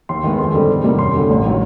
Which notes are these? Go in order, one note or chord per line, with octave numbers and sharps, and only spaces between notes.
D#2 C6
D#3 G#3 B3
F2 C6
D3 G3 C4
E2
C3 D#3 G3 A#3
F#2 C6
D3 G3
A1
D#3 F#3